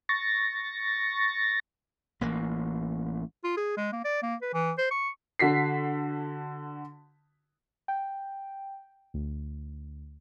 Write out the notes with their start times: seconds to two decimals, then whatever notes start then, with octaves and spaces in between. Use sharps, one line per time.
0.09 C#6 A6 A#6
2.21 A1 E3 A#3
3.44 F4
3.57 G#4
3.77 G#3
3.93 A#3
4.05 D5
4.23 A#3
4.42 B4
4.53 E3
4.78 C5
4.91 C#6
5.39 D3 F#4 B6 C7
7.88 G5
9.14 D2